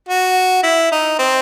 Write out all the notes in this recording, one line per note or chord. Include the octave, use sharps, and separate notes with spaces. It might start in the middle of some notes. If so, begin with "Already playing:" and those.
F#4
E4
D#4
C4